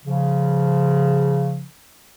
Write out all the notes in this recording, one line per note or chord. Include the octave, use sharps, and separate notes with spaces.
C#3 F3